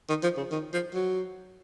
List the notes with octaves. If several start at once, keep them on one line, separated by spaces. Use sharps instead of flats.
D#3
F3
C#3
D#3
F3
F#3